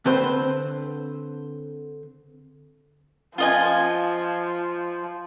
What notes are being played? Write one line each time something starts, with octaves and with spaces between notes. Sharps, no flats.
D3 C4 B4 C5
F3 F4 D#5 G#5